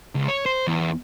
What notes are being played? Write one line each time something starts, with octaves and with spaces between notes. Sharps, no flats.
C#2
C#5
C5
E2